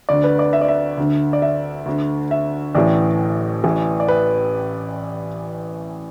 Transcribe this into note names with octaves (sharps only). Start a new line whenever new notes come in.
D2 D3 D5
B4
D5
E5
D5
E5
D2 D3
D5
E5
D2 D3
E5
A1 A2 E3 D5
A1 A2 E3
D5
B4